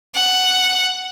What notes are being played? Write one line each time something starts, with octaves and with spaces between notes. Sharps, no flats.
F#5